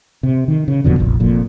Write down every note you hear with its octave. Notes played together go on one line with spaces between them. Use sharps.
C3
D#3
C#3
G1 F2 B2 D3
F1 A#1
F1 F2 A#2